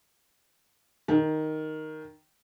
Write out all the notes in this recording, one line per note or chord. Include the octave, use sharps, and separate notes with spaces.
D#3